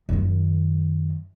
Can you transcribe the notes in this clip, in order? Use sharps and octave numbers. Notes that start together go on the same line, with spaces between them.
F#2 D#3